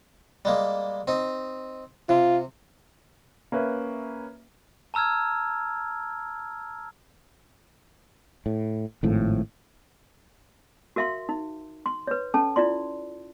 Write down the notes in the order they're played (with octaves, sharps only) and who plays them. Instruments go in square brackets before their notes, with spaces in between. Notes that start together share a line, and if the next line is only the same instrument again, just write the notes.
[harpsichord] G3 G#3 A#3
C4 D#4
[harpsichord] C3 [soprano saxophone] F4
[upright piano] A#3 C#4 B4 E5
[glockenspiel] A5 A#5 E6 F6 G#6
[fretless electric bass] A2
G#1 A2 F3
[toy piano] F#4 A#4 E5 F5 C6
D#4
C6
B4 C#5
C#4 A4 A5
E4 F4 D5 C6